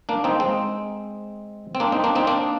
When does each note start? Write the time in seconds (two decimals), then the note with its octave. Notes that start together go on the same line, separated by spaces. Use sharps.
0.09 A#3 D4
0.24 C4 D#4
0.40 G#3 C4
1.75 C4
1.80 A#3 D4
1.92 C4 D#4
2.04 A#3 D4
2.15 C4 D#4
2.27 A#3 D4